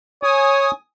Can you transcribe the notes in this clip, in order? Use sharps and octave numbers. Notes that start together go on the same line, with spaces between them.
C#5 G#5 D#6